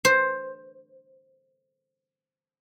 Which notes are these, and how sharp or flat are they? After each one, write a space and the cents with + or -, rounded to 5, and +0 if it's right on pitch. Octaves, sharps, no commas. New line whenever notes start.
C5 +10